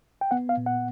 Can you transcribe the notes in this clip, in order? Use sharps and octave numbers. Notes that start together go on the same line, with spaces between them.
G5
B3 F#5
F5
A#2
F#5